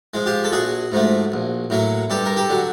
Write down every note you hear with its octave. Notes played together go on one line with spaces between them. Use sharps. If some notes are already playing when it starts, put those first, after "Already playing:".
F3 G#3
F4 G4
A4
A#1 F#4 G#4
G#2 F3 A3
A#1
A2 F#3 A#3
G2 G4 A4
A#4
G4 A4
D3 F#3